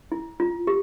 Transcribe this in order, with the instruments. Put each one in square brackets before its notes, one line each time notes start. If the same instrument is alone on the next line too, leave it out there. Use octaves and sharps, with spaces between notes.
[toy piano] E4
F4
G4